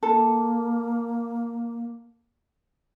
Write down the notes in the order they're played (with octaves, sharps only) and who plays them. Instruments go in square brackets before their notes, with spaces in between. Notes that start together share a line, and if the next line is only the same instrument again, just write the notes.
[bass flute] A#3 [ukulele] A4